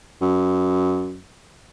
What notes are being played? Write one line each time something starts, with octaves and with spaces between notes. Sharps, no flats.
F#2